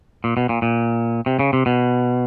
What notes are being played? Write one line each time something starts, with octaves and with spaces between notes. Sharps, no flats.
A#2
B2
A#2
A#2
C3
C#3
C3
B2